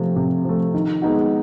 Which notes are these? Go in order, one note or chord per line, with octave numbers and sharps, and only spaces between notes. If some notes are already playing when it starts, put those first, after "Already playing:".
Already playing: C3 F3 A3
C3
F3 A3
D#3
G#3 B3 D#4 F#4